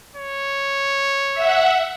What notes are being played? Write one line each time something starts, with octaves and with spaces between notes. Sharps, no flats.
C#5
E5 F#5